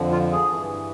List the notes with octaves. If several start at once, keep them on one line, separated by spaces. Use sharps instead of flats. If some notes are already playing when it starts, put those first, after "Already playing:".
Already playing: F2 D3 F3
F4
G#4
G2 E3